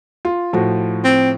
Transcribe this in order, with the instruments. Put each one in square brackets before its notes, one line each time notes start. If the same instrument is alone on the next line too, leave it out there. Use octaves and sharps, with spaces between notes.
[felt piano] F4
A2 F3 F#4
[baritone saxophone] C4